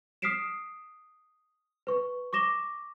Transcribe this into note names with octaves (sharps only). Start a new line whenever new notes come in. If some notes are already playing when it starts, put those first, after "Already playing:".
D#6 F6 B6 C7 D7 E7
B4 C#6
C#6 D6 A#6 E7 G7